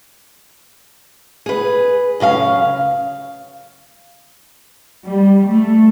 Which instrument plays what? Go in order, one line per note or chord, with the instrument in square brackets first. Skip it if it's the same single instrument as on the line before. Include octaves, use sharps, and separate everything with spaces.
[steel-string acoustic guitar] G#4 B4
F#2 C#3 G4 F5
[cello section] G3
A3